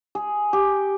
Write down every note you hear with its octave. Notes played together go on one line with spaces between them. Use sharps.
G#4
G4